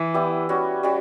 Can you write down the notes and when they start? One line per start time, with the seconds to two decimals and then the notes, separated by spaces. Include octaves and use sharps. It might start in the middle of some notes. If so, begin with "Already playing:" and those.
Already playing: E3
0.14 B3 E4 G4 D5
0.49 G3 C#4 F#4
0.83 G3 C#4 F#4